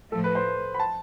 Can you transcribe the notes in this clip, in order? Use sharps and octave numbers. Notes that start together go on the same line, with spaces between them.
A2 F3 A3 A4
B4
C5
B5
A5